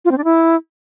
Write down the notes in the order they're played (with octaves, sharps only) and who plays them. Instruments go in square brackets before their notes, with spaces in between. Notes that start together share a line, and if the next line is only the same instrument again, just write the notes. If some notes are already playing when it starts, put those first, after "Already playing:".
[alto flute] F4
C4
D4
E4